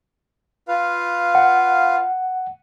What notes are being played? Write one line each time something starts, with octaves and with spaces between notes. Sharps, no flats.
F4 B4 F5
F#5